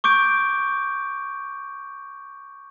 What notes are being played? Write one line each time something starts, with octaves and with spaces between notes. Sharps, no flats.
C#6 D6 G6 D7